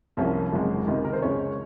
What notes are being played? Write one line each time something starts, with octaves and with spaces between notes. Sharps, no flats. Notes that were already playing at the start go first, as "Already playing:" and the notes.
C2 C3 F3 A#3 C#4
G#1 F#2 C#3 G#3
C#2 C3 D#3
A#4
C5
C#2 C#3 G#3 C#4 C#5